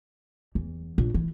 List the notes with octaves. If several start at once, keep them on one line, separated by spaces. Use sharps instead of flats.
E2
A#1
E3